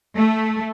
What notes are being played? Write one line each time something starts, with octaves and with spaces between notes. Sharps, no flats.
A3